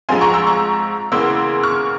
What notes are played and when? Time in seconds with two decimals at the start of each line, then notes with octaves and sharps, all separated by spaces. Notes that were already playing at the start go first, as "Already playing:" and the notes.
0.09 G#2 F3 G#3 C4 F4 G#5 C6
0.21 A#5 C#6
0.34 C6 E6
0.47 A#5 C#6
1.12 E2 C#3 E3 A#3 C6 E6
1.63 C#6 F6